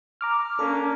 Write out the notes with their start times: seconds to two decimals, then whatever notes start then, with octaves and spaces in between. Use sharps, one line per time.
0.21 A#5 D6 F6
0.59 A#3 C#4 D4 A4